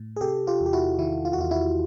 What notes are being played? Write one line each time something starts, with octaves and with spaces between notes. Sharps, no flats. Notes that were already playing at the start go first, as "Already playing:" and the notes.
Already playing: A2
G#4
C3 G4 A4
F4 G4
E2
G4
E4 F#4
D#3 E4
F4
F#4
E2 F4
E4 F#4